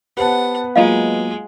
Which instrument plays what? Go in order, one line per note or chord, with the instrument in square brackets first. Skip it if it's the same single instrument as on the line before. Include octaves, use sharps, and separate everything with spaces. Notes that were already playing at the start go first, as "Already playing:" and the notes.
[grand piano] B3 B4 [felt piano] G4 C5 A5 [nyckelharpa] F#5
[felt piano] F#3 A#3 [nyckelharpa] G#3 [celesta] F4 D#5 F5